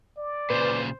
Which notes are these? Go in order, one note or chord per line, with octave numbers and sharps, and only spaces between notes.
D5
A#2 C#3 B4 C5